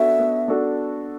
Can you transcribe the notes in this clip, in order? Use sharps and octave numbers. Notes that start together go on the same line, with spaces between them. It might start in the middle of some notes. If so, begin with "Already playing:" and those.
Already playing: B3 D4 F#4 A4 E5
B3
D4 F#4 A4